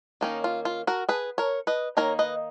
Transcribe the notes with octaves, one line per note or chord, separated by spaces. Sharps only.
D#3 A#3 C#4 D#4
F4
F4
F#4 A#4
G#4 B4
A#4 C#5
B4 D#5
D#3 A#3 D#4 A#4 C#5
B4 D#5